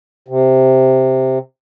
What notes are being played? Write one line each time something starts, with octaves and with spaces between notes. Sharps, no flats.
C3